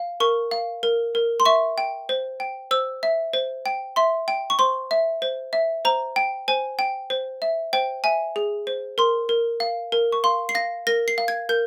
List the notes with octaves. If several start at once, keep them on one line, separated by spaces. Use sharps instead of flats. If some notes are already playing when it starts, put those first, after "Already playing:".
Already playing: F5
A#4 C#6
F5
A#4
A#4
C6
E5 C#6
G5
C5
G5
C5 E6
E5
C5
G5
E5 C6
G5
C#6
C5 C6
E5
C5
E5
C5 A#5
G5
C5 G#5
G5
C5
E5
C5 G5
E5 G#5
G#4
C5
A#4 C6
A#4
F5
A#4
C#6
F5 C6
C7
F5 A#6
A#4 A#6
C7
F5
G#6
A#4 G6